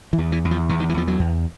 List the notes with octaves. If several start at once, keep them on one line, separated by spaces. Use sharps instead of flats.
E3
E2
E3
E2
F3
E2 E3
D#3
E3
E2 F3
F#3
E2